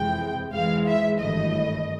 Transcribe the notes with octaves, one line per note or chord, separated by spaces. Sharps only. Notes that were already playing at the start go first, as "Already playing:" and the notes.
Already playing: F2 C3 E3 G#3 G5
G#2 E3 G#3 F5
E5
G#1 G2 E3 A3 D#5